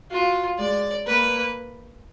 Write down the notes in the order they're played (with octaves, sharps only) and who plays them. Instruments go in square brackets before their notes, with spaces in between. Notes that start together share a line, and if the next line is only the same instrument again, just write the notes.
[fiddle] F4 [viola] F#4
[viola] G#3 [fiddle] D5
[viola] A#3 [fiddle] B4